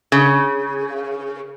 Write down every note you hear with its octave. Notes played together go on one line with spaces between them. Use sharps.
C#3